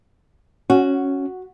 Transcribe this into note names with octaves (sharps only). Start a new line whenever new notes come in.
C#4 F#4